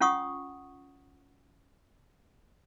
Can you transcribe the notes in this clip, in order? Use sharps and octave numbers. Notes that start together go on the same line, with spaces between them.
C#4 F4 F#5 C#6 D#6